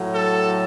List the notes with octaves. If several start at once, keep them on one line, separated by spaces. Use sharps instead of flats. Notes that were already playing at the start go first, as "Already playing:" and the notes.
Already playing: A2 F#3
A4